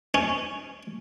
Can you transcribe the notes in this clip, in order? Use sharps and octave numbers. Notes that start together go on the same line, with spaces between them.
C#4